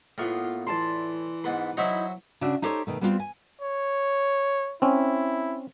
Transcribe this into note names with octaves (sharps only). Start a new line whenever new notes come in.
A2 A#3 B3 F4
E3 D5 A5 C6
G#2 B3 B4 C6
F#3 D#4 E4 C5 E5
C#3 D4 F#4 E5
D#4 E4 G4 A4 C5 C#5
B2 D#3 A3
G3 B3 C4 D4 F4
G#5
C#5
C4 C#4 E4